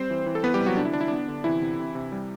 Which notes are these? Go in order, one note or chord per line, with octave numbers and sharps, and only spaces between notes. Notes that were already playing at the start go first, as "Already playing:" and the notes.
Already playing: G3 C4 C5
E3
E3
A4
E3 B3 B4
G3 G4
C3
F#3 F#4
D3 D4
E4
D3 D4
E4
B3 D4
D3
C3 E3 E4
C3
C3
C3
G3